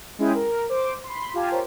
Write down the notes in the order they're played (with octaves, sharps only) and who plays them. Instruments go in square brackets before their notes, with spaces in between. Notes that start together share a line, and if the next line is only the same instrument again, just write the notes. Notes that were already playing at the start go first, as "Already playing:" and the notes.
[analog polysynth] G#3 C#4 E4 G#4 E5 G5
A#4
C5 D6
B5 C6
F4 G4 F5 G#5 A5
F4 G4 A#4 C5 C#5